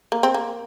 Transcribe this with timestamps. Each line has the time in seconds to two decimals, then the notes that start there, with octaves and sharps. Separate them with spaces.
0.12 A#3
0.23 C4
0.34 A#3